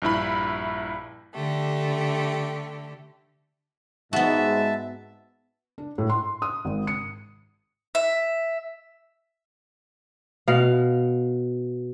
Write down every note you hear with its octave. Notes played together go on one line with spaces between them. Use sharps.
A#1 G2 E4 B5
D3 A3 G4
G#2 B3 F#4 E5 A5
D4
A2
C6
D#6
G#1
C#7
E5
B2 F5